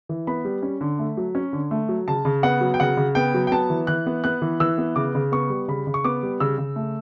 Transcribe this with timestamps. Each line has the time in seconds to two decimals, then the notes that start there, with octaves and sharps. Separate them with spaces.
0.09 E3
0.27 B3 B5
0.45 G3
0.62 C#4
0.81 D3
0.99 A3
1.17 F#3
1.35 C#4
1.53 D3
1.71 A3
1.89 F#3
2.08 C#3 A5
2.25 C#3
2.43 B3 F#5
2.61 F#3
2.74 G5
2.80 C#3 F#5
2.97 C#3
3.15 B3 G5
3.34 F#3
3.47 G5
3.52 B3 A5
3.70 E3
3.87 E3 F#6
4.06 B3
4.24 B3 F#6
4.42 E3
4.60 E3 E6
4.78 B3
4.96 C#3 D6
5.15 C#3
5.32 B3 C#6
5.50 G3
5.68 C#3 B5
5.87 C#3
5.94 C#6
6.04 B3 D6
6.23 G3
6.40 C#3 E6
6.58 C#3
6.76 A3